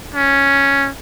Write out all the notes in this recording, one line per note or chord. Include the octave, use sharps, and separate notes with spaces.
C#4